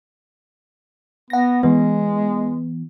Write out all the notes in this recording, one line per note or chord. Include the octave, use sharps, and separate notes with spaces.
B3 F#5 A#6
E3 G#3 B3